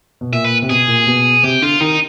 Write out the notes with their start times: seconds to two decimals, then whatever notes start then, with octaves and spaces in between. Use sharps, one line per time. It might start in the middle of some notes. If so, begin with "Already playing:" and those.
0.21 B2
0.32 A#2 E5
0.44 B4
0.62 C3
0.69 B2 G#4
0.88 A#2
1.07 B2
1.43 C3 G4
1.62 D3 F4
1.80 D#3 D#4